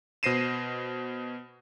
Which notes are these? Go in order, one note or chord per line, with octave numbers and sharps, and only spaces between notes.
B2 C5 A#6 C7 D#7 E7